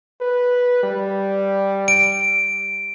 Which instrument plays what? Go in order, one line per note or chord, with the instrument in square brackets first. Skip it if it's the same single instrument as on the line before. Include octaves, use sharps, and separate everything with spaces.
[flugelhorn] B4
G3
[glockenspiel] D7